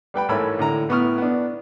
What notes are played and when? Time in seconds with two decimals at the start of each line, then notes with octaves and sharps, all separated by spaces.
0.14 G3 B4 G5 B5
0.29 A1 G#2 A4 A#4 C#5 B5
0.59 A2 D3 A#5
0.89 A2 B3 E4 C#6 D#6 F6
1.18 B3 D4